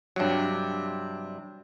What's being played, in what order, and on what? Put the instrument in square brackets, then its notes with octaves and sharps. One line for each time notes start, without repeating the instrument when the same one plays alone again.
[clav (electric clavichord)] G2 F#3 [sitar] C3 D4